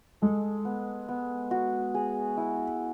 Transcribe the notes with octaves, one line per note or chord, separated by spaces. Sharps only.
G#3 A4
B3
B3
F#4
G#4
E4